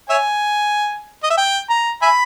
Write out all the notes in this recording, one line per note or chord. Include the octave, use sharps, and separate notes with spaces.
C#5 E5 G#5
D#5
E5
G5
A#5
E5 G#5 B5